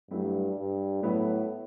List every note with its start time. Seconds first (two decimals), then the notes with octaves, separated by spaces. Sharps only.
0.11 G2 F#3 A3 E4
0.57 G2
1.02 A2 F#3 B3 E4 B4